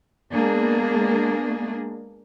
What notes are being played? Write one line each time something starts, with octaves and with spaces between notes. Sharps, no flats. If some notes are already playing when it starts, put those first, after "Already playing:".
G#3 A#3 B3 D4 G#4